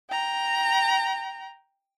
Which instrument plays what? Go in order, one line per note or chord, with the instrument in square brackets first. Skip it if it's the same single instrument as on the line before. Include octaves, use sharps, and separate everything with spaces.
[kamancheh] G5 A#5